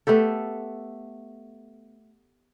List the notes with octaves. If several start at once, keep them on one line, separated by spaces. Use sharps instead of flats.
A3 B3 G4 A4